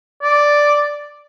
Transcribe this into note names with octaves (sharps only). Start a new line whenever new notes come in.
D5